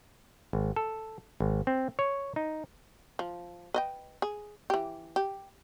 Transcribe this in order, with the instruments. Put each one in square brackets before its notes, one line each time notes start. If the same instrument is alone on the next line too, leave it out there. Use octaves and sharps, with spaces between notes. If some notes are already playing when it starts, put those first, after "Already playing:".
[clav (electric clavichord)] G#1
A4
G#1
C4
C#5
D#4
[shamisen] F3
B4 D#5 G5
G#4
E3 G4
G4